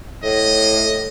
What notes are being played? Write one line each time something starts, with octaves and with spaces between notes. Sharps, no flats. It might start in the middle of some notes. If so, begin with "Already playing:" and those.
A2 D#5